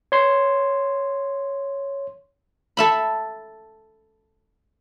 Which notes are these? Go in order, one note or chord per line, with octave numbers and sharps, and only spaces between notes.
C#5 C6
A4 E5 B5